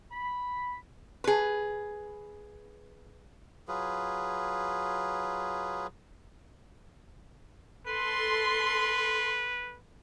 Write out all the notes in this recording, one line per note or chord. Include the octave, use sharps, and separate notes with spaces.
B5
G#4 B4
F#3 F4 G#4 B4
A4 B4 C6